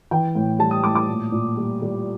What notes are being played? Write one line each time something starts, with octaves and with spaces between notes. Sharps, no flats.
E3 G5
A2
G3 A5
D#6
A2 D6
D6
A#2
A#2
G3
G3